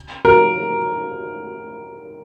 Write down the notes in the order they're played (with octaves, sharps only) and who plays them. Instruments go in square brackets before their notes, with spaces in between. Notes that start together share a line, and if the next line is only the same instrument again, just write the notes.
[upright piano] A#4